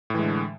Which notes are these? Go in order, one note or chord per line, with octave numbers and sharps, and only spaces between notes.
A2 D3 E3 G#3